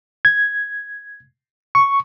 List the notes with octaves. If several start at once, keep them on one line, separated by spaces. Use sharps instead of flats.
G#6
C#6